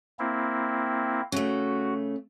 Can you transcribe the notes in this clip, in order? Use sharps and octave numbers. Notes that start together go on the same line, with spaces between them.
A#3 C4 E4
C#3 A3 F#4